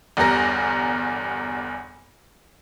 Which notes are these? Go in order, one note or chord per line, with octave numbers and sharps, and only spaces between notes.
G1 E2 G3 A#4 A#6